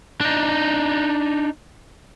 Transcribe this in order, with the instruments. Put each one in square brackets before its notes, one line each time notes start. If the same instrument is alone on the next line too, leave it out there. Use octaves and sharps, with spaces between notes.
[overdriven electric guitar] D4 D#4